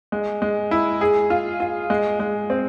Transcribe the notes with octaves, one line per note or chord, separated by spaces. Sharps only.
G#3
G#3
E4
G#4
F4
F4
G#3
G#3
C4